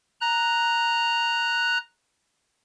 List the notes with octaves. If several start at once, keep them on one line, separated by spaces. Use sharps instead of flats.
A#5 F#6